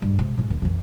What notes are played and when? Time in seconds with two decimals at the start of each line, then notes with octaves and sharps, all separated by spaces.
0.02 G2
0.19 C3 G#3
0.37 G#2 C#3
0.50 D#2
0.62 F2 E3